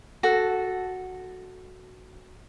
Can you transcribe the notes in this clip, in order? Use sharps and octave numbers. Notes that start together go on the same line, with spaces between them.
F#4 A4 A5